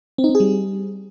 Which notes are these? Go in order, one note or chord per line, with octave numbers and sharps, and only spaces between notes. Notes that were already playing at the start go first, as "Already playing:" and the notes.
C4
D#4
C4
G#4
G3